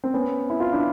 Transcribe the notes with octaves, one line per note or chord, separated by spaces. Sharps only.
C4
B3 C#4
E4
F4
D4 E4